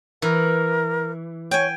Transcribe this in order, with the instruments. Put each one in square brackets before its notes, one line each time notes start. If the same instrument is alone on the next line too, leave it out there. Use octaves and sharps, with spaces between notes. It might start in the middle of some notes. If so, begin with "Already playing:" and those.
[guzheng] E3 [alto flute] A#4
[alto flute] C#5 [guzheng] G5 G#5